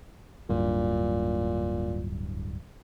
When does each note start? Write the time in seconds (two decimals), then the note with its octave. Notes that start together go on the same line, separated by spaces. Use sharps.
0.49 D1 G2 A#2